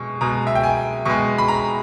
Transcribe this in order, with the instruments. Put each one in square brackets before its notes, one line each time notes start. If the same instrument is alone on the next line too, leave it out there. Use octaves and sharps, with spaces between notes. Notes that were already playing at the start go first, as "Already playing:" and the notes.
Already playing: [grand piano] B2 G#3 C#6
B2 G#3 A#5
E5
G5
G#5
B2 G#3 C#6
B5
A#5